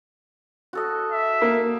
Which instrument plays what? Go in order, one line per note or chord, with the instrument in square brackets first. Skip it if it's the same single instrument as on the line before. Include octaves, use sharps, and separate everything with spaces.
[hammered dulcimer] F#4 A4 D#5
[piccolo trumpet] E5
[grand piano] A#3